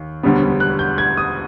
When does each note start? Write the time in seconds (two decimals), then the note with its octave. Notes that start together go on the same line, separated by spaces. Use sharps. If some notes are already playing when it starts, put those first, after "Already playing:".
Already playing: D#2
0.23 E1 D2 D3 G3 B3
0.60 F#6
0.79 G6
0.98 G#6
1.17 D#6